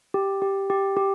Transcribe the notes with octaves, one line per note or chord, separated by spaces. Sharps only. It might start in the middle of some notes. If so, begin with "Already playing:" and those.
G4
G4
G4
G4